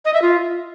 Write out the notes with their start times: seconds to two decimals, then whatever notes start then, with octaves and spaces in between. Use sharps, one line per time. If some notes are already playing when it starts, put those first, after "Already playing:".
0.05 D#5
0.14 E5
0.22 F4